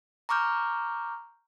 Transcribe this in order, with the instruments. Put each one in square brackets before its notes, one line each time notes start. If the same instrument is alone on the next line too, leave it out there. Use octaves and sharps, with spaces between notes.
[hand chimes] A#5 C#6 D6 F6 G6